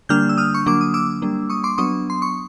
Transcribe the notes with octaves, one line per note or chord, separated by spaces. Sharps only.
D3 G3 A#3 D4 F6 G6
E6
D#6 F6
C#6
D3 F#3 A#3 D4 D6
D#6
D6 E6
G3 A#3 D4
C#6 D#6
C6 D6
F#3 B3 D4 C#6 D#6
C6
C#6